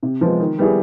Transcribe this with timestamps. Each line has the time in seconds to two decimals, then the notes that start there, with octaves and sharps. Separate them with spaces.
0.03 C3
0.21 F3 G#3 B3
0.40 D#3
0.58 G3 B3 E4 G#4